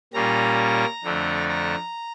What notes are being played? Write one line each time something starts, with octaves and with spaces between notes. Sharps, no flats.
A#2 G3 A#3 C#4 A#5
F2 D3 A3 D4
A#5